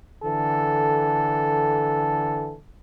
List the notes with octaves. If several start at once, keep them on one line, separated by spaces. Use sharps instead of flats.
D3 E3 A4